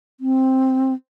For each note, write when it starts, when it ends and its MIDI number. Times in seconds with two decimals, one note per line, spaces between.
0.20 0.94 60